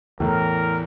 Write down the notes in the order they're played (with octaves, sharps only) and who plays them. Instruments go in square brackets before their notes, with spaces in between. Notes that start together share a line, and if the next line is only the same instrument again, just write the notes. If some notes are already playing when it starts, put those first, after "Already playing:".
[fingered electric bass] E2 [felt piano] A2 [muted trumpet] A#4